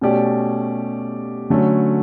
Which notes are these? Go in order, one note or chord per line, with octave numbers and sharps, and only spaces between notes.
B2 A3 C#4 G4 D5
D3 F#3 A3 C#4